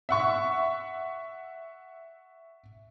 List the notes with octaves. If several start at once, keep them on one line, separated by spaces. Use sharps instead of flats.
E5 F#5 C#6